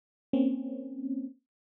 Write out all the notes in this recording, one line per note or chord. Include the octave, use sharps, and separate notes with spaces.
A#3 C4 C#4